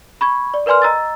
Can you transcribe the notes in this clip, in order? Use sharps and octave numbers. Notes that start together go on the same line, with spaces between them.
B5 C#6 G#6
D5
A#4 B4 D5 G#5 C6 F6
D#5 A#5 E6 A6